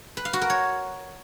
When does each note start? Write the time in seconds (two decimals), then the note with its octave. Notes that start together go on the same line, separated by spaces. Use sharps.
0.17 B4
0.25 F5
0.33 F#4
0.42 A#4
0.50 C#5